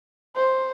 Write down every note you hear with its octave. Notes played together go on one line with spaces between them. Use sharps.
C5